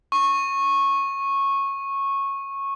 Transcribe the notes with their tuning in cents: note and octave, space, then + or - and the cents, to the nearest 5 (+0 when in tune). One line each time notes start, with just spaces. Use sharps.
C#6 -15